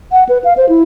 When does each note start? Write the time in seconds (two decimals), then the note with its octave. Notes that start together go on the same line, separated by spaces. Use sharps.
0.12 F#5
0.29 B4
0.44 F5
0.57 C5
0.69 E4